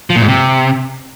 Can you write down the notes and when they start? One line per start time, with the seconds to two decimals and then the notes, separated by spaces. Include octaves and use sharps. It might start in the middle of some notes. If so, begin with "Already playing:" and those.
0.10 F3
0.16 A#2
0.22 G#2
0.28 C3